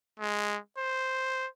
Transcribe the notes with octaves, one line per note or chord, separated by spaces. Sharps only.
G#3
C5